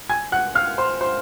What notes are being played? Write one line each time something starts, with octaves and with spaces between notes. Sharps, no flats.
G#5 G#6
F#5 F#6
F5 F6
C5 C6
C5 C6